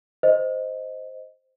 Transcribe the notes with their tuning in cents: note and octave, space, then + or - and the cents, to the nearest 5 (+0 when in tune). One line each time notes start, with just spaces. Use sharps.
C5 -5 D#5 +0